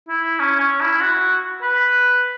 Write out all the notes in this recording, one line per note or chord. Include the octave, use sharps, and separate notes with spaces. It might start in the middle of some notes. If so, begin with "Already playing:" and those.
E4
C#4
C#4
E4
F#4
B4